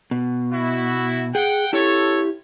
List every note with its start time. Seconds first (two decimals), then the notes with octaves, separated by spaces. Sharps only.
0.11 B2
0.52 E4 F#4
1.35 G#4 F#5 G5
1.73 E4 G4 A4 C#5